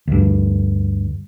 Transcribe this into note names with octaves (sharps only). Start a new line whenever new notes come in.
D2 G2